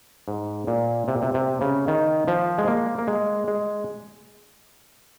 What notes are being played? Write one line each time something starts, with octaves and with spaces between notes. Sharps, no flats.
G#2
A#2
C3
A#2
C3
C3
C#3
D#3
F3
G#3
A#3
A#3
G#3
G#3